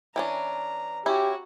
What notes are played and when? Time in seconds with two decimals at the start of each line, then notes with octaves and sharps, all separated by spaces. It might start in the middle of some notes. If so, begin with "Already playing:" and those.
0.16 E3 C#4 D4 A#5
1.06 C#4 E4 F#4 G4